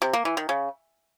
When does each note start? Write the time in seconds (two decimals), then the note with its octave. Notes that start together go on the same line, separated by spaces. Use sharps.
0.02 C3
0.13 A#3
0.25 E3
0.37 D#3
0.49 C#3